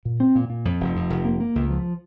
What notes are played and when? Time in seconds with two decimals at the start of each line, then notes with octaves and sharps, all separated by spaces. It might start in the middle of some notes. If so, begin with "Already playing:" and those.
0.05 A#2
0.20 C4
0.35 A#2
0.50 A#2
0.65 F2
0.80 F1
0.96 F2
1.10 F1
1.25 A#3
1.41 A#3
1.55 C#2
1.70 F3